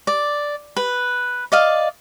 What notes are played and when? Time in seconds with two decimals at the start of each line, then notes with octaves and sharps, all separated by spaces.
0.07 D5
0.76 B4
1.52 D5 D#5 F5